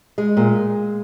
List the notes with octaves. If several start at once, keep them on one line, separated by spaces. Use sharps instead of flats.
G#3
A#2